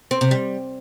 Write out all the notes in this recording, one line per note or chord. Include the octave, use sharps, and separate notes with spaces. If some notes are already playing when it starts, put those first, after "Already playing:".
C4
C3
G3